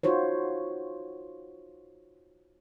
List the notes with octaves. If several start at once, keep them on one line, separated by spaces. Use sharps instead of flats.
D#4 F4 F#4 C5 C#5